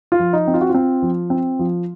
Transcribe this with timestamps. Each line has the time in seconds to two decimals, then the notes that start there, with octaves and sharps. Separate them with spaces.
0.12 F4
0.19 F3
0.33 D#4
0.47 C4
0.54 F4
0.61 F#4
0.69 F4
0.75 C4
1.03 F3
1.30 C4
1.59 F3